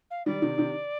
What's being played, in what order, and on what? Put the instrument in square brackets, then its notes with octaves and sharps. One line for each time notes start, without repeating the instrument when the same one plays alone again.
[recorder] F5
[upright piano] D#3 G3 [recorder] D5
[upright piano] C3 D#3
C3 D#3